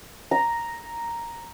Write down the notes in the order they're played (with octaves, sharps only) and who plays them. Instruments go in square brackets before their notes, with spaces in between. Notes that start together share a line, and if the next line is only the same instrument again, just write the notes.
[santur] A#5